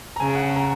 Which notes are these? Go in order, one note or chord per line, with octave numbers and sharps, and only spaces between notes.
A#5
C#3 G#5
F#5
F#5
A#5